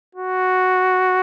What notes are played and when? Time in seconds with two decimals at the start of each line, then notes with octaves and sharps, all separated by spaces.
0.15 F#4